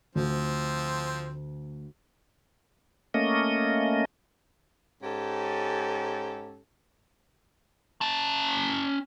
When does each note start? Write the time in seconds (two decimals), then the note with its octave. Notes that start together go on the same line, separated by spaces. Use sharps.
0.15 D2 F3 C4
3.14 A3 A#3 C#4 D#5
5.02 G#2 C#4 G4 A4
8.01 C#4 A5